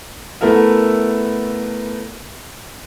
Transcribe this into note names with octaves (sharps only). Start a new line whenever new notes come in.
A3 B3 E4 A4 A#4 E5